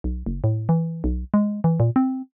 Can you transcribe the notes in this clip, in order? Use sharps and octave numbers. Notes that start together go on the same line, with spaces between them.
B1
F#1
A2
E3
B1
G#3
E3
A#2
C4